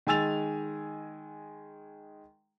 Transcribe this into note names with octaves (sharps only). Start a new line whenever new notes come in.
D#3 G#3 G#5 E6 A6 F7